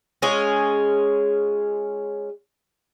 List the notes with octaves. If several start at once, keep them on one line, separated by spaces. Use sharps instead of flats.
G#3 C#4 F4 G#4